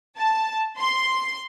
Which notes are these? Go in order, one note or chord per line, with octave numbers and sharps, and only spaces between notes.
A5
C6